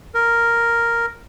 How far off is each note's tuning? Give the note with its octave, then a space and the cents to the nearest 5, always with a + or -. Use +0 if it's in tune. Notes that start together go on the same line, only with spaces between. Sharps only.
A#4 +0